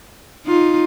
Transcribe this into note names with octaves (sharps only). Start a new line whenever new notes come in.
D#4 F4